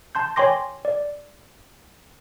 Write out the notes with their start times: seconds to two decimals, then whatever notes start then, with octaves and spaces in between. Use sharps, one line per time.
0.15 A5 C6 G6
0.36 C#5 G5 G#5 C6 D6 A#6
0.85 D5